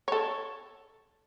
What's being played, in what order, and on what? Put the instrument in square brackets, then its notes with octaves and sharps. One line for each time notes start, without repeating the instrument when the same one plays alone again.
[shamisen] A4 C#5